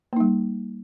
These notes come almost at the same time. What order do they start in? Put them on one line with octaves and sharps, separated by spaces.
A#3 D#4 G3